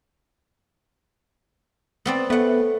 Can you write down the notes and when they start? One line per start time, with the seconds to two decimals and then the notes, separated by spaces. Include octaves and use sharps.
2.05 B3 C4 D5
2.30 A3 B3 F#5